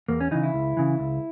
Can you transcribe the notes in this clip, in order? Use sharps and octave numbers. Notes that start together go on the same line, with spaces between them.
E2 A#3
C#4
C#3 E3 D#4
E4
C#2
C#3 E3
C#2